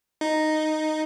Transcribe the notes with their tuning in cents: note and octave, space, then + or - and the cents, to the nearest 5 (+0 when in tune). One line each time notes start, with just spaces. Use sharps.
D#4 -5